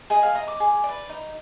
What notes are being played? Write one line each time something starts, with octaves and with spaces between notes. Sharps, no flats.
G#4 D#5
F5
D#5 A#5
D6
G#4
B4 D5
D#4